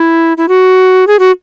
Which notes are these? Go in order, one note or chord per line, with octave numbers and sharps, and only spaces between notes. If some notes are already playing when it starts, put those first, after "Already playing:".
Already playing: E4
E4
F#4
G#4
F#4